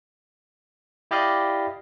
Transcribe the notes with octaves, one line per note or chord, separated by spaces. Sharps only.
E4 G4 D5 D#5 F5